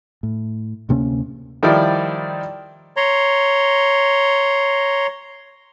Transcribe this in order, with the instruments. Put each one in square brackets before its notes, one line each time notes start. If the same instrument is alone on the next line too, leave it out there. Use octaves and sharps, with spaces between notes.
[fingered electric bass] A2
D2 C3 A#3 C#4
[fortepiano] D#3 F3 G3 E4 D5
[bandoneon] C#5 A#5 C6